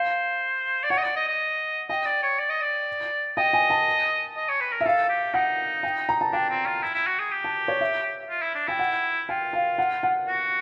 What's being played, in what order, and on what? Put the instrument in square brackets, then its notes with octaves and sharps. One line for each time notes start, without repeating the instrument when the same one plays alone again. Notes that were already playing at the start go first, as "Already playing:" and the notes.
Already playing: [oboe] C5 [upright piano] F5
[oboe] D5
[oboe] C#5 [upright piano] F#5
[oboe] D#5
D5
D#5
D#5
[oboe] D#5 [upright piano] G5
[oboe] D5
C#5
D5
D#5
D5
[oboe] D#5 [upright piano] G5
[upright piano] G#5
A5
[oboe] D#5
C#5
B4
A#4
[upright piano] E5
[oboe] A4 [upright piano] F5
[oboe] G4
[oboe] D#4 [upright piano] F#5
[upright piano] G5
A#5
A5
[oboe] D4 [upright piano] G5
[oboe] C4
F4
E4
E4
F#4
G#4
G4
[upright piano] A5
C#5
E5
[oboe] F4
E4
D4
[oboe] E4 [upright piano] G5
[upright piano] F#5
[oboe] F4 [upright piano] G5
[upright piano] F5
F#5
F#5
[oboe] F#4